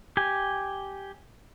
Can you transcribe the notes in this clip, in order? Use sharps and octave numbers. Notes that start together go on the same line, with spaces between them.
G4 G#5